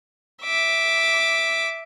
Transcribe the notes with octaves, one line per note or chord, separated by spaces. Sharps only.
E5 D6